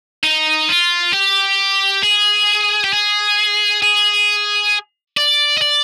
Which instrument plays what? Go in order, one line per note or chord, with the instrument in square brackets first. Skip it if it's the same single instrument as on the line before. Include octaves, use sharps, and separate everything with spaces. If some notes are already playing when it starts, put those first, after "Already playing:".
[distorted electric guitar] D#4
F4
G4
G#4
G4
G#4
G#4
D5
D#5
D5